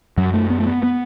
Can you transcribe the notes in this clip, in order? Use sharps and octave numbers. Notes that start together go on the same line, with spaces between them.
F#2 F#3
A3
B3
A3
B3
B3